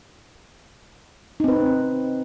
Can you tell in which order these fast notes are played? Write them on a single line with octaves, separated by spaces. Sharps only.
D#4 C4 B4